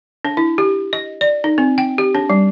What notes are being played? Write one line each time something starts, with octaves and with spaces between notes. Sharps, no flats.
D4
E4
G4
D#5
D5
D#4
C4
G5
G4
D4
G3